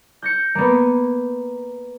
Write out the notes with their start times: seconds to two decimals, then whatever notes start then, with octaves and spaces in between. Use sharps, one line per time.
0.22 G6 A#6 C#7
0.55 A#3 B3